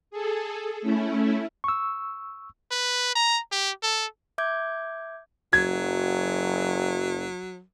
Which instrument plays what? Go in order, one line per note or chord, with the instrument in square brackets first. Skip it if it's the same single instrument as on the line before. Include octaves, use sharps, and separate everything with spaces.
[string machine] G#4 A4
A3 C#4 E4
[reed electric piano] C#6 E6
[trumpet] B4
A#5
G4
A4
[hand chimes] E5 D6 G6 G#6
[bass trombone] F#1 [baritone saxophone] F#3 [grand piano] G#6